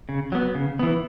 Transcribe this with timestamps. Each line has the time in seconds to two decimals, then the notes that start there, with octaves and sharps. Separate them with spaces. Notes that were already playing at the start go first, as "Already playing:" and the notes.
0.09 C#3
0.32 F#3 B3
0.55 C#3
0.79 E3 B3